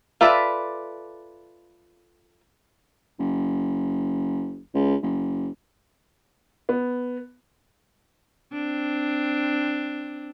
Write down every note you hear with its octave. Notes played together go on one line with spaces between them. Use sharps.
F4 A4 B4 D5 E5
F#1
C#2
F#1
B3
C4 D4